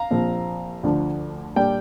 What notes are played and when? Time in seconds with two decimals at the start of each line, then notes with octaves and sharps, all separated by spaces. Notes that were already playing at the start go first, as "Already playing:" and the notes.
Already playing: F5 A#5
0.11 A#1 A#2 F3 C4
0.83 D2 D3 F3
1.56 A#2 G3 D4 D5 G5